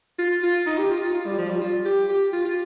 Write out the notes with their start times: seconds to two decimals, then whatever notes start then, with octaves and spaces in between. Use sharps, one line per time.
0.19 F4
0.43 F4
0.66 D#4
0.78 G4
0.90 F4
1.02 F4
1.14 F4
1.26 G3
1.38 F3
1.50 G3
1.61 F4
1.85 G4
2.09 G4
2.33 F4
2.46 F4